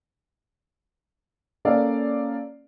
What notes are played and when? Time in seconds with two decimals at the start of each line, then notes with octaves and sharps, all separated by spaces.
1.65 A#3 C#4 A4 D5 F5